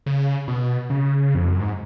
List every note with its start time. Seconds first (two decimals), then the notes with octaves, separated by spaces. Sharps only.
0.06 C#3
0.48 B2
0.90 C#3
1.35 F2
1.48 F#2
1.60 G#2